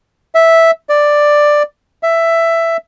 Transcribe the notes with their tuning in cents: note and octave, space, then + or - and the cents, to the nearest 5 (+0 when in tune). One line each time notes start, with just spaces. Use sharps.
E5 -5
D5 +5
E5 +10